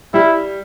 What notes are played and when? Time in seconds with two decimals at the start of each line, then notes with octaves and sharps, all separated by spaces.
0.14 G3 E4